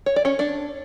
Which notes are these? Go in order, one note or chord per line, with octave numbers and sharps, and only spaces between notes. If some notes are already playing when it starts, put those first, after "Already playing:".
C#5
D5
C#4 C#5
D4 D5